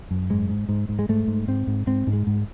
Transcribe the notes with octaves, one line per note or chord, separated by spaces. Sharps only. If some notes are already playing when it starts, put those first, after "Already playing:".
F#2
G#2 G#3
G#2
G#2
G#2
G#3
G#2 A3
G#2
G#2 C4
G#2
G#2 C4
G#2
G#3
G#2